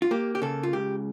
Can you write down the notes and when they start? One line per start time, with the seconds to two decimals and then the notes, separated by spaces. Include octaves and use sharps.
0.02 F4
0.11 A#3 G4
0.35 G4
0.42 C#3 A4
0.63 F4
0.73 C#2 G4